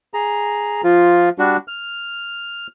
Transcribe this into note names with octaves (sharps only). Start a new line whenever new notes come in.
G#4 A#5
F3 F4
G3 D4 F#4
F6